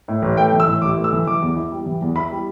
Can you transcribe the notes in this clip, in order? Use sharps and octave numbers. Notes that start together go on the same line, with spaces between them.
A2
A1
A3 G5
E3
E6
A2
A1 D6
A3
E6
E3
E3 D6
E2
E4
G3
E3
E2
E4 B5
G3